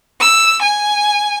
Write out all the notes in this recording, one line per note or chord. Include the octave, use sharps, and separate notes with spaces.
E6
G#5